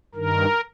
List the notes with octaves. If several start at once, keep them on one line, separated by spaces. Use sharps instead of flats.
G2 D#3 A#4